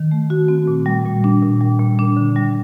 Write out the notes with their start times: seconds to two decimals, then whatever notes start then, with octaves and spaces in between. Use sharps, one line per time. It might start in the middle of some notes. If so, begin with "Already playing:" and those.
Already playing: D#3
0.11 A3
0.30 F#4
0.48 C4
0.68 A#2
0.86 G3
1.06 A#2
1.24 D4
1.42 A#2
1.61 G3
1.79 A#2
1.99 D4
2.17 D3
2.36 G3